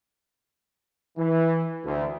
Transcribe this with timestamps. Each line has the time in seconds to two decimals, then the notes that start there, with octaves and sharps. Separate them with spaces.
1.18 E3
1.85 D2